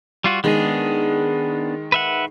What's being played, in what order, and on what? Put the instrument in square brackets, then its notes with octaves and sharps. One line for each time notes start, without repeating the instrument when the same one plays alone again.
[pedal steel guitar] G3 F4 F#4
[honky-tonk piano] D#3 G#3 [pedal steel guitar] B3 D4 G#4
[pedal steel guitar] B4 E5 F#5